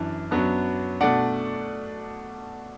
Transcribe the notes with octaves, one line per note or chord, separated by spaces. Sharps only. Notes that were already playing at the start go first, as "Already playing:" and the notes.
Already playing: F#2 E3 D4
F#2 F#3 B3 D4
B2 A3 D4 D5 F#5